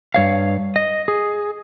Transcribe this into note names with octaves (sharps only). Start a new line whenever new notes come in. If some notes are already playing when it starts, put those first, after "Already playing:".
G2 C#5 F5
D#5
G#4